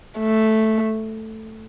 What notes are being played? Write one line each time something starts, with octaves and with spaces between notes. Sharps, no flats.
A3